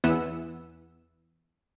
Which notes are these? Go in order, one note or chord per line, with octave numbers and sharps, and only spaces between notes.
E2 E3 B3 E6